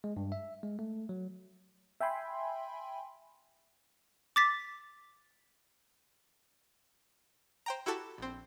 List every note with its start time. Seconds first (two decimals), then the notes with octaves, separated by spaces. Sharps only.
0.04 G#3
0.17 G2
0.32 E5
0.63 G#3
0.79 A3
1.09 F#3
2.01 E5 G5 G#5 B5 C6
4.36 D6 A6 B6
7.66 C5 G5 A#5
7.86 E4 F#4 G4 A4 A5
8.18 A#1 C4